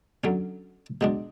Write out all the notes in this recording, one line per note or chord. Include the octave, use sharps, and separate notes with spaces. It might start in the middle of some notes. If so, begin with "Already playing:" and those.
D3 F#3 C#4
B2 G#3 D4